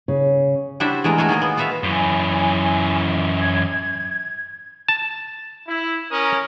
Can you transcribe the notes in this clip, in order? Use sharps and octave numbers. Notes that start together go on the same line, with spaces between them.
C#3
G3 D4 E4 F#4 C5 E5
E2 G#3 A3 A#4
A3 F#4 G#4 C#5 D#5
D#3 A#3 G#4 D#5
B3
F4 F#4 B4 E5 F5
F#2 E3 G#5
G#6
A5
E4
C#4 A#4 D#6